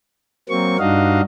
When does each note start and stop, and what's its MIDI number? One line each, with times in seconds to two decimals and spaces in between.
0.49 0.77 54
0.49 0.77 58
0.49 0.77 60
0.49 0.77 85
0.79 1.21 43
0.79 1.21 62
0.79 1.21 63
0.79 1.21 66
0.79 1.21 75
0.79 1.21 77